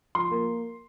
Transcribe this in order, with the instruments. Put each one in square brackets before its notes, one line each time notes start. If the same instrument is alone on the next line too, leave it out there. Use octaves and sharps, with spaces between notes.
[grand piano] F3 C6
A#3